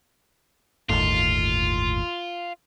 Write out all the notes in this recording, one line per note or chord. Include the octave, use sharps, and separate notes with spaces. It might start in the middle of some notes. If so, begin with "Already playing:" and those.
G1 D#2 A2 F4